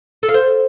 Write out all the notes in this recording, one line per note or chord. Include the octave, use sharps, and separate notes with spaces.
A4
F5
C5